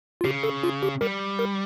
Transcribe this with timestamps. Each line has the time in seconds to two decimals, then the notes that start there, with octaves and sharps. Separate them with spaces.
0.21 F4
0.25 C#3 G4
0.43 A4
0.63 F4
0.83 G4
1.01 G3 A#4
1.39 A#4